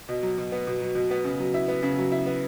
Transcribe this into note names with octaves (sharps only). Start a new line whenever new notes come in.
B2
F#3
B2
B3
B2
F#3
B2
B3
C#3
F#3
E4
B3
C#3
F#3
E4
B3